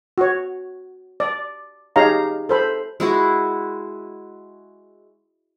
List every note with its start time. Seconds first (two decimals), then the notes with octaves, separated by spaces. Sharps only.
0.18 F#4 C#5
1.20 D5
1.96 D#4 G4 G#4 C#5 F5 A#5
2.49 A4 C5 B5
3.00 G#3 E4 F#4